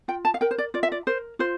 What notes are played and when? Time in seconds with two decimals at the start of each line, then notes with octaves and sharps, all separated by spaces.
0.08 F4 G5
0.25 A5
0.34 F5
0.41 A#4 G5
0.51 C5
0.58 D5
0.74 F4 D5
0.83 E5
0.92 D5
1.07 A#4 C5
1.39 F4 C5